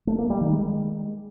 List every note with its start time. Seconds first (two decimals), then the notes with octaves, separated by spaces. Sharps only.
0.07 A3
0.18 A#3
0.30 G3
0.41 D#3
0.52 G#3